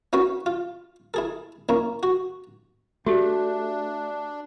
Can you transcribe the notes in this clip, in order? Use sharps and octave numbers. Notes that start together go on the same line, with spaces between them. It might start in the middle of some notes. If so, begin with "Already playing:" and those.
C#4 E4 F#4 B4
F4
E4 G#4 A4
A#3 C#4 E4
F#4
A3 D4 F#4 G4 A4